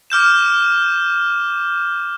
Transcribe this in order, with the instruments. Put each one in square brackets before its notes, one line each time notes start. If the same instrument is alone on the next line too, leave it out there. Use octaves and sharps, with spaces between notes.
[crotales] D6 F6 G6 E7